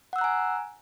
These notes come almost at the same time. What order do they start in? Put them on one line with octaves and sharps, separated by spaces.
F#5 E6 F#6 A#5 G#5